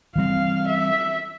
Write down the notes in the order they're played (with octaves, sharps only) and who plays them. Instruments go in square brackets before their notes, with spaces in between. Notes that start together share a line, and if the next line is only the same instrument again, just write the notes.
[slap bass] E3 G3 C4 [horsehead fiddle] F5
[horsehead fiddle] E5